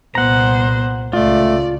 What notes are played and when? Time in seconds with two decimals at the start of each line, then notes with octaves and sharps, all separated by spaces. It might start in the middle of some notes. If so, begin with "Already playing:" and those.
0.15 C2 A#2 B3 C5 F#5 A#5
1.13 C#2 C#3 A3 F4 D5